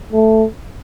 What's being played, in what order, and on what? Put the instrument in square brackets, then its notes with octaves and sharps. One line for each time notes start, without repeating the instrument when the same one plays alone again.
[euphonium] A3